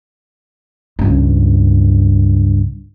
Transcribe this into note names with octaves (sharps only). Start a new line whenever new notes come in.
C#2 G2